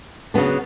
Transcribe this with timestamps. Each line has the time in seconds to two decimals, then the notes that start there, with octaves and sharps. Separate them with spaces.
0.34 C#3 F#3 B3 D4